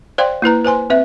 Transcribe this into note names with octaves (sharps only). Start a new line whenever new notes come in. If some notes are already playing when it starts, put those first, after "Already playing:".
C5 D5 F5 G5 C6
A#3 E4 B4 A#5
B4 C5 G#5 C6
C4 B4 E5